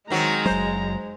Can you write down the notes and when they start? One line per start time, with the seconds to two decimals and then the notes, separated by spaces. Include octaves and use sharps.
0.10 D#3 F#3 G#3 C4 A#5
0.46 F#1 F#3 C5